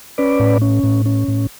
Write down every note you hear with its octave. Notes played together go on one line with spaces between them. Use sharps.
C#4 B4 D5
A2
C#4
A2
C#4
A2